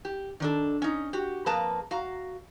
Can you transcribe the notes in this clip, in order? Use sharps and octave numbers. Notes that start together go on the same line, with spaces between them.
G4
D#3 D4 A4
C#4 D#4
F#4 G4
F2 A#3 G#4 B4 A5 A#5
F#4 F5 A#5